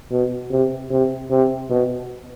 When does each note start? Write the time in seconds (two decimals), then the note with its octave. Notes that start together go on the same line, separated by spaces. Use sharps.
0.11 B2
0.51 C3
0.91 C3
1.30 C3
1.70 B2